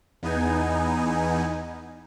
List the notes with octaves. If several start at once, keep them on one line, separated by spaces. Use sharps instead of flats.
E2 B3 D#4 G#5